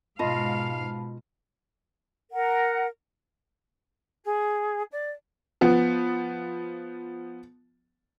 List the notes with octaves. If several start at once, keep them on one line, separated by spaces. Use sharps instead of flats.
G#2 B2 F4 D#5 F5 A5 B5
A#4 F#5
G#4
D5
F3 B3